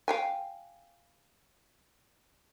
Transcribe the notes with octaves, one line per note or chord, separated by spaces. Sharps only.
F5 G5 G#5